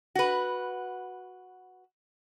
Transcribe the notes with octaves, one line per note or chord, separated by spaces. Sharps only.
F#4 B4